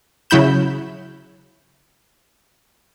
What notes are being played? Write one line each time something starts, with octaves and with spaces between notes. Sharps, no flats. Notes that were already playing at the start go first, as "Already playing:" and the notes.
C#3 F#3 E4 B5 G6 E7